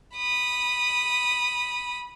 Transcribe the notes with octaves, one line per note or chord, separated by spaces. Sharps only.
B5 D#6